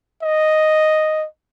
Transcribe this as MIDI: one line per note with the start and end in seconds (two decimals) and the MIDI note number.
0.23 1.26 75